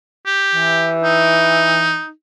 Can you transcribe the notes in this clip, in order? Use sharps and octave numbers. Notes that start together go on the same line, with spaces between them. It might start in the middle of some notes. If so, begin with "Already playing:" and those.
G4
E3
D#4